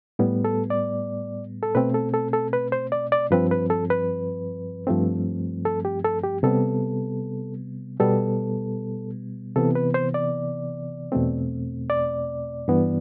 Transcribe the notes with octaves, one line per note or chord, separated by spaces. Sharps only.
A2 G3 B3
A4
D5
A4
B2 A3 C4 B4
A4
A4
A4
B4
C5
D5
D5
G2 F3 C4 B4
B4
A4
B4
G2 F3 A3 C4
A4
G4
A4
G4
C3 G3 B3 A4
B2 G3 B3 A4
C3 E3 B3 A4
B4
C5
D5
E2 B2 A3 C4
D5
G2 E3 B3